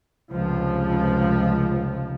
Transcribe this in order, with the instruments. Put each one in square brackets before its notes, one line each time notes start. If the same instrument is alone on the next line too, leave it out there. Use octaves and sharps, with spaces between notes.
[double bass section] F1 C#2 F3